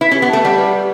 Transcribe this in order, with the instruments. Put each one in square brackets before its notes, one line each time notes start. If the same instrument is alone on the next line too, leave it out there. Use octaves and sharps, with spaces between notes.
[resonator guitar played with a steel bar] E4 [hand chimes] B4
[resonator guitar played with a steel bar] C#4
[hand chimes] G4
[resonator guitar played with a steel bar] B3
[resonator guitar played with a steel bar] A3 [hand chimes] A5
[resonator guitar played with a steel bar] G3 [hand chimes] F#5
[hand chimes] B4
G4